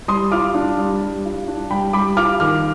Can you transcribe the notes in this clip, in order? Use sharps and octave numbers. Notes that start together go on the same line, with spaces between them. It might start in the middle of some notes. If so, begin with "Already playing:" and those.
G3 C6 D#6
F4 D6 F6
D4
G3
G3
F4
D4
G3 G5 B5
G3 B5 D6
F4 D6 F6
D#3 D6 F6